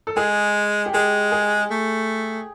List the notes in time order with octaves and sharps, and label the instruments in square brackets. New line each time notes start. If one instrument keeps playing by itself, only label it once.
[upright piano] A4
[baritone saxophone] G#3 [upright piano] G#4
[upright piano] G4
[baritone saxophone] G#3 [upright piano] G#4
[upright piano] G#4
[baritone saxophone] A3